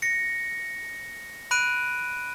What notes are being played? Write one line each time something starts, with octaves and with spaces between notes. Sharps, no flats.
A#6 C#7
B5 F#6 D7 D#7